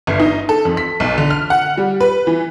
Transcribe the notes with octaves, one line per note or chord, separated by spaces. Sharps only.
G1
D#4
A4
F2
B6
B1
D3
F6
F#5
G3
B4
E3